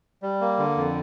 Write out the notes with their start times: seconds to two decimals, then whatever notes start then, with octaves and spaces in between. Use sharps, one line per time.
0.22 G3
0.41 A#3
0.58 D3
0.77 F2